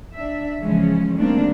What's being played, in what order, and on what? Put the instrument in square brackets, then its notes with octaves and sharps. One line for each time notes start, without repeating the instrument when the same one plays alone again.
[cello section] D4 E5
C#3 E3 F3 G#3 C#4
D#3 G3 A3 A#3 C4 D4